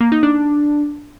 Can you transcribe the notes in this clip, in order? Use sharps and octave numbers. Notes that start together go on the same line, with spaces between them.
A#3
D#4
D4